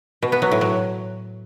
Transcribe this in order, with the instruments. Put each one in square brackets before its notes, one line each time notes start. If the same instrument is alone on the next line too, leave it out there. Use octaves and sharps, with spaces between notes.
[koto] B2
B3
F#3
A2
F#3